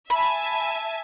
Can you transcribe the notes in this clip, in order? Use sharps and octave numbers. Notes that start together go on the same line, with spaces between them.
E5 G#5 A5 B5